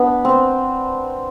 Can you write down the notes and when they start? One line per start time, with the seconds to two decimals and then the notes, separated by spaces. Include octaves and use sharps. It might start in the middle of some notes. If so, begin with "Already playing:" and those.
Already playing: B3 D4
0.25 C4